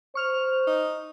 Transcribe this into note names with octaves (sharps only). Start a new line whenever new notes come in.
C5 C#6 F6 F7
D#4